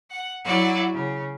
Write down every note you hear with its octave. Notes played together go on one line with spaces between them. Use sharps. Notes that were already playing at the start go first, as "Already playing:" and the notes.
F#5
F#3 E4 F#4 D5
C#3